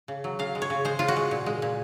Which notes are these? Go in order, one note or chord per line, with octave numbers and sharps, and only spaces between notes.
C#3
F#3
C#3 F5
G#3
C#5
C#3
G#3 C5
C#3 F4
F#4
G#3
A#2
G#3
A#2